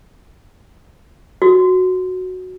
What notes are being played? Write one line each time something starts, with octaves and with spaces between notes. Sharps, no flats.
F#4